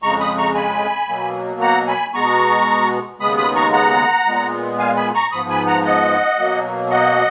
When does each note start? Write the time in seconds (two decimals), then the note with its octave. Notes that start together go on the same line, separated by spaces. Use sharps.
0.02 F2 C#3 G#3 A#5 C#6
0.20 B5 D#6
0.38 A#5 C#6
0.55 G#5 B5
1.08 B2 F#3 A#3
1.61 F#5 A#5
1.88 G#5 B5
2.14 B2 G#3 B3 A#5 C#6
3.19 D#2 C#3 G#3 B3 B5 D#6
3.37 B5 D#6
3.55 A#5 C#6
3.73 F#5 A#5
4.27 A#2 G#3 B3
4.79 F5 G#5
4.97 G#5 B5
5.14 A#5 C#6
5.32 G#2 F3 B3 B5 D#6
5.49 G#5 B5
5.67 F#5 A#5
5.85 D#5 F#5
6.38 B2 F#3 A#3
6.90 D#5 F#5